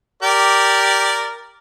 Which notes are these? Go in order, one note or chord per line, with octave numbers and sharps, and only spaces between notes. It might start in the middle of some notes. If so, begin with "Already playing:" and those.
G4 A#4 D5